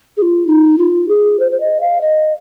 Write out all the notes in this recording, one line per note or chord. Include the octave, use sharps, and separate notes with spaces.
G#4
F4
D#4
F4
G#4
C5
C5
D#5
F5
D#5